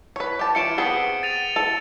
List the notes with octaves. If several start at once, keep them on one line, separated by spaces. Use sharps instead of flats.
B4 C#5
G4 A5
E3 F4 C#5 C#7 D7 E7
B3 C4 G#4 G7
A6 D#7 F7
A4